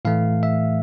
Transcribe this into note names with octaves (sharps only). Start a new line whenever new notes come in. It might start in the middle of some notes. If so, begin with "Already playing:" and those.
A2 E3 A3 F5
E5